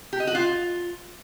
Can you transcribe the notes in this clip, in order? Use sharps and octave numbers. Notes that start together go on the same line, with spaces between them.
G4
D#5
F#4
F4